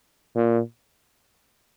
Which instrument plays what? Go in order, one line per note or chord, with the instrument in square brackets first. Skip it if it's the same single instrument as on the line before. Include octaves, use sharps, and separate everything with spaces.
[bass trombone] A#2